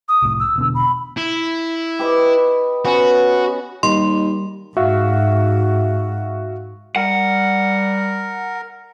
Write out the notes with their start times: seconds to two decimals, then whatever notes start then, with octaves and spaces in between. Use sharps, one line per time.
0.09 D#6
0.22 C2 A2
0.40 E6
0.56 E1 B2 D3
0.75 B5
1.17 E4
1.99 G4 B4 D#5
2.85 B3 C#4 F#4
3.83 D#2 G3 D#5 C6
4.77 G#2 F#4 E5 F5
6.96 G3 A#4 F#5